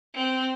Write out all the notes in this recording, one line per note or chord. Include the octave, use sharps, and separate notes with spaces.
C4